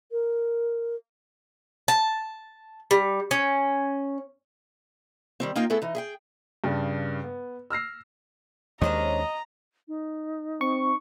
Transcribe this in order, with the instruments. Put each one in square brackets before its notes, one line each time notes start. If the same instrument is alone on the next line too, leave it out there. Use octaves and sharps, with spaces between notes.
[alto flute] A#4
[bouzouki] A5
G3
C#4
[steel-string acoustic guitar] D#3 G3 C4
A#3 D#4 F4 A#4 G5
A3 B3 E4 G#4 A4
E3 D#4
G#4 E5 G5
[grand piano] G2 C#3 D4
B3
E6 F6 A#6 C7
[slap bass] D#2 G#3 [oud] C#4 D4 C5 [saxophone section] D#5 [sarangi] A#5
[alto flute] D#4
[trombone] C4 [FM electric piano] C#6